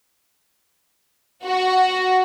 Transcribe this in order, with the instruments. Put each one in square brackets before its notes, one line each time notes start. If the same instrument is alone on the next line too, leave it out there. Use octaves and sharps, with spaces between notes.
[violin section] F#4